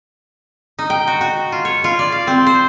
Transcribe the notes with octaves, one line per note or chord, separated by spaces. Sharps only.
D#4
G5
F#4
F#4
F4
C#5
F4
D5
F5
C4
C5